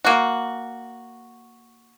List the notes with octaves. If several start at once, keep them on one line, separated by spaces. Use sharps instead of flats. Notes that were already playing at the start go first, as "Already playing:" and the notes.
A#3 F#4